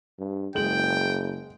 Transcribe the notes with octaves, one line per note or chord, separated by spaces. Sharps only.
G2
F#1 G#3 G5 F#7